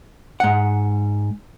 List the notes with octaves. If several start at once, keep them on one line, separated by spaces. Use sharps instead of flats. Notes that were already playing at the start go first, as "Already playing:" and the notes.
G#2 F#5